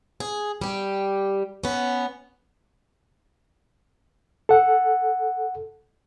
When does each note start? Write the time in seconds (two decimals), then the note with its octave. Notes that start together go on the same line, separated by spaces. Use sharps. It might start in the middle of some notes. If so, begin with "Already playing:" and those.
0.20 G#4
0.61 G3 G4
1.63 B3 C#4
4.49 A4 F#5